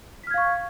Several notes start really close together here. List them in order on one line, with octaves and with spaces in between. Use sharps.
B6 F6 G#6 F5 C#6